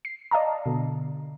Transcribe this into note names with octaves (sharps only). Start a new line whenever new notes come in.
C7
D5 D#5 F5 A5 A#5
B2 D3